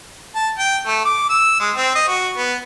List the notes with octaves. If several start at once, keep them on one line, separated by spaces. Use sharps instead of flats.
A5
G5
A3
D6
E6
G#3
C4
D#5
F#4
B3